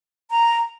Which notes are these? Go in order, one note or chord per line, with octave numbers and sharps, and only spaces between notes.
A#5